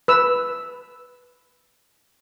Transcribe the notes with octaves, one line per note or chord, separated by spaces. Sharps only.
B4 E6